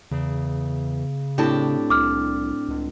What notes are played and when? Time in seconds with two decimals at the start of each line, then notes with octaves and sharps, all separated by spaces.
0.11 E2 C#3
1.38 A2 C4 D4 G4 A5
1.90 C2 D6 F6
2.69 C#2